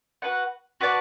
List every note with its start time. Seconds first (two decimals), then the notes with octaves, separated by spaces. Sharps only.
0.22 F#4 B4 F#5
0.81 F#4 B4 D5 A5